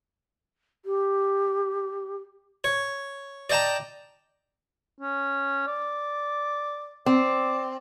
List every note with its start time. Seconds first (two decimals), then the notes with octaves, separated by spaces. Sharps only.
0.85 G4
2.64 C#5
3.50 D5 D#5 G5 A5 A#5
5.00 C#4
5.67 D5
7.06 C4 D5